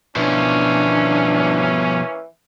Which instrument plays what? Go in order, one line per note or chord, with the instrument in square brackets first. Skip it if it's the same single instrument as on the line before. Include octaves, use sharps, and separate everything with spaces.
[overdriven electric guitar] B2 F3 [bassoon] E3 [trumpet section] A#3 C#4 [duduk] D4